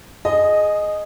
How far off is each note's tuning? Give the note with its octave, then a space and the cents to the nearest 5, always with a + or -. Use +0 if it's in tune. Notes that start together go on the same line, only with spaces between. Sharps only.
G#4 +10 D#5 -10